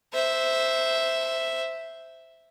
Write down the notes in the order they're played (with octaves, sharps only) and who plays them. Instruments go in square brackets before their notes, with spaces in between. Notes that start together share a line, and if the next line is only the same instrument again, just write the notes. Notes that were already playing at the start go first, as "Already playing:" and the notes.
[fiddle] C5 E5